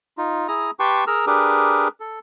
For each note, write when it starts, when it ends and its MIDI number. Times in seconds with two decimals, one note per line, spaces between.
0.18 0.48 63
0.18 0.48 65
0.48 0.71 64
0.48 0.71 68
0.48 0.71 82
0.48 0.71 87
0.79 1.04 67
0.79 1.04 71
0.79 1.04 79
0.79 1.04 81
0.79 1.04 84
0.79 1.04 85
1.07 1.25 68
1.07 1.25 70
1.07 1.25 82
1.07 1.25 88
1.07 1.25 89
1.27 1.88 62
1.27 1.88 67
1.27 1.88 68
1.27 1.88 70
1.27 1.88 71
2.00 2.19 69